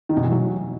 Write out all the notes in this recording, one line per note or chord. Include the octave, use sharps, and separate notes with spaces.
D#3
B2
E3
F#3